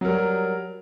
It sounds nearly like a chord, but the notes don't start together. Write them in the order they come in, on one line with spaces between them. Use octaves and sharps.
F#3 A#4 G3